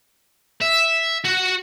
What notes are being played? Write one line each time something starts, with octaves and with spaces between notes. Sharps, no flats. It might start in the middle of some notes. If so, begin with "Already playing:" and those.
E5
F#4